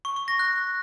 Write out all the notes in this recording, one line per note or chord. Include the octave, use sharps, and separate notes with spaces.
C#6
C#6
A#6
F#6